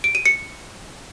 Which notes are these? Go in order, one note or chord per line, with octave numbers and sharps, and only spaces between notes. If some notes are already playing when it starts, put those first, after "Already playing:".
D7
D#7
C#7